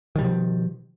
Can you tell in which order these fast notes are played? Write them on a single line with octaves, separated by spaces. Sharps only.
D#3 G3 B2 F3